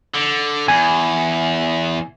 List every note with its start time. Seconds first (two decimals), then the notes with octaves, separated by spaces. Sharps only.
0.14 D3
0.68 E2 G#5